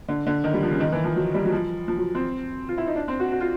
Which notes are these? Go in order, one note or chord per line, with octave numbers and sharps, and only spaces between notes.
D3
D3
D#3
G3
F3
C#3
D#3
E3
F3
F#3
G3
F#3
F3
F3
F#3
C4
F4
E4
D#4
D4
C4
F#4
F#4
F4